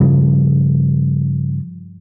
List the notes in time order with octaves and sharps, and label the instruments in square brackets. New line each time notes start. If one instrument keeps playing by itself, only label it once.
[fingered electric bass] G2 C#3 F3 G3